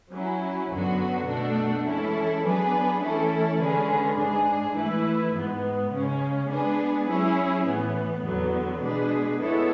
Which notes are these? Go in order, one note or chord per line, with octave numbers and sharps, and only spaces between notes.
F#3 C#4 E4
F#2 D3 F#3 B3 F#4
B2 A3 D4 F#4
E3 G#3 C#4 E4 A4
F#3 B3 D4 G#4 B4
E3 A3 C#4 E4 A4
D3 G#3 C#4 G#4 B4
G#2 G#3 D4 G#4
E3 A3 E4 B4
G#2 G#3 B3
C#3 G#3 C#4
G#3 B3 D4 G#4 B4
F#3 C#4 E4 G#4 C#5
A2 E3 B3
E2 D3 F#3 B3
B2 G#3 D4 G#4 B4
G#3 B3 E4 A4 C#5